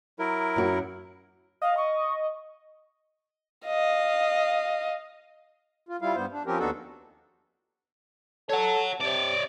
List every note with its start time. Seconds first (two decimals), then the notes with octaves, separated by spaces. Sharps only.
0.19 F#3 E4 A#4
0.56 F#2 F#4
1.62 D#5 F5
1.77 C#6
3.66 D#5 F5
5.89 F4
6.02 G3 E4 F4 F5
6.16 G2 G3 B3 C5
6.33 D4
6.46 F3 C4 C#4 G4 A#4
6.59 D#2 B3 D4 D#4 F#4 A4
8.50 A4 C#5 F#5
9.01 C3 C#5 D5